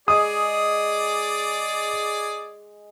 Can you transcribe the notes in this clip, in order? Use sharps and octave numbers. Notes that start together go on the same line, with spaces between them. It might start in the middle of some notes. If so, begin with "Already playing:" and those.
G#3 G#4 D5 D#6